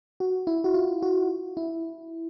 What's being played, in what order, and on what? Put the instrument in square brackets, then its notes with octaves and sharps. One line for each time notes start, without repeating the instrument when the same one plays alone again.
[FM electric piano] F#4
E4
F#4
F4
F#4
E4